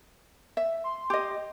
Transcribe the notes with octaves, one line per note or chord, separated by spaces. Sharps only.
E5
C6
G4 D#5